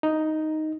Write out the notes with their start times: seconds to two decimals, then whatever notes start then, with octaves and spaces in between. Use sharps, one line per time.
0.03 D#4